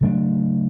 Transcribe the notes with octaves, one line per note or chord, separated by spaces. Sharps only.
C#3 F#3 A3 D4